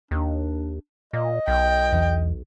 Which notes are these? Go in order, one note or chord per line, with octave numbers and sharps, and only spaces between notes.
D#2 D4
A#2 D#5
B1 G5
E1 E2